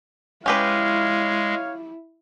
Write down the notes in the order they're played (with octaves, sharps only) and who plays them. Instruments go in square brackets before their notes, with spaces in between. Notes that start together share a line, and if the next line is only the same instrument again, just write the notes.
[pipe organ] G#3 [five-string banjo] C#4 G4 B4 [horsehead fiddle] E4 [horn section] C#5 F5